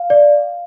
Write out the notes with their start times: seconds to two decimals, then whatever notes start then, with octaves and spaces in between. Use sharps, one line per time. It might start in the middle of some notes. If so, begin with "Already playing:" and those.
Already playing: F5
0.10 D5